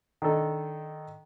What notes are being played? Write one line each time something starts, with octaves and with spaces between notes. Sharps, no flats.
D#3 D4 A4